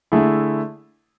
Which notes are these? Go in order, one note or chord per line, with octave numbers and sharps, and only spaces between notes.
D3 A3 E4 G#4